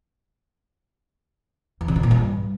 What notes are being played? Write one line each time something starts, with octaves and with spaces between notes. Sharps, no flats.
E2
C#3
D3
A#2
G2